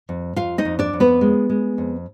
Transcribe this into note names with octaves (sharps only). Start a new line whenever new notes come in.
F2
F2 F4 F5
D#4 D#5
F2
D4 D5
F2
B3 B4
G#3
G#3
F2